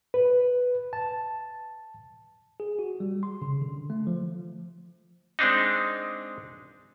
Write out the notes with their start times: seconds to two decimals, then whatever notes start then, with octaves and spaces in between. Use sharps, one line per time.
0.14 B4
0.93 A5
2.60 G#4
2.79 F#4
3.00 G3
3.23 C6
3.42 C#3
3.62 D3
3.90 A3
4.07 F3
5.39 G#3 C4 D4 D#4